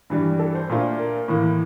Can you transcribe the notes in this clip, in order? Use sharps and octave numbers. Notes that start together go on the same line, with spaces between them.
G2 E3 G3
A4
C5
A#2 A3 D4 F4
A#4
A2 E3 A#3